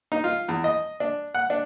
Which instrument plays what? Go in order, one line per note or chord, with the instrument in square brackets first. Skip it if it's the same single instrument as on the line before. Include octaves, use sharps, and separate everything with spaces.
[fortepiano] D#4
F4
E2
D#5
D4
F#5
D4